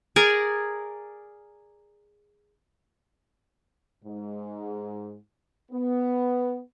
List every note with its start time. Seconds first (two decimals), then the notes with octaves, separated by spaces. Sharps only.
0.16 G#4 A#4 D5 G#5
4.04 G#2
5.72 B3